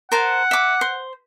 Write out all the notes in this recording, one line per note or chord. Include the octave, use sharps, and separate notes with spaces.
A#4 C5 F#5 A5
E5 D6
C5